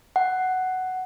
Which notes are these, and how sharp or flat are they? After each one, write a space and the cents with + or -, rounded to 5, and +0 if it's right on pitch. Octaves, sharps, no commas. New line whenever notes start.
F#5 +10